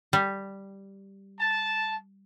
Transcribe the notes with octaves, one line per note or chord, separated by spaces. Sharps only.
G3
A5